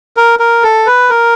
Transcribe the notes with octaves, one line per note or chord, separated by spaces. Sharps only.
A#4
A#4
A4
B4
A#4